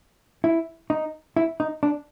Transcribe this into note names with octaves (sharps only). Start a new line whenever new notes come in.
E4
D#4
E4
D#4
D4